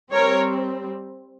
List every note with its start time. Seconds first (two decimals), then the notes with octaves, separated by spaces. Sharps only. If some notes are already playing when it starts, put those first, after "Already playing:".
0.12 G3 C4 A#4 C#5